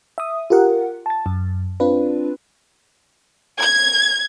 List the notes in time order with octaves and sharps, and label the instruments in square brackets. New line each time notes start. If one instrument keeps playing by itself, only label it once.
[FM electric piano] E5 D#6
F4 G4 A#4 F#5
A5 A6
F#2
C4 D4 F4 B4
[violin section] G#6